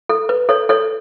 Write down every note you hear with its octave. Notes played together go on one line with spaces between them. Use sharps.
A4
B4
A4 C#5
A4 C#5